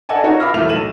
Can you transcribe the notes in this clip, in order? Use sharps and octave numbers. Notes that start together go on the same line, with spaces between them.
A4 D5 D#5 F#5 G#5 A5
D#4 F4 F#4 C#5 D#5
F5 B5 D6 E6 F6 A#6
E1 E3 F#3 A3 F6 F7
B1 D#7 E7 F#7